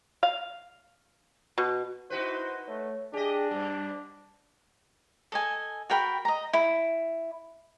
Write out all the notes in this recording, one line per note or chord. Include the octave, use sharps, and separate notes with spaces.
F5
B2
D#4 E4 F#4 B4 C5
A3 C#5
D4 G4 G#4 D#5
G2 G3
A4 D#5 G#5
F#4 A#4 G5 B5
D#5 A#5
E4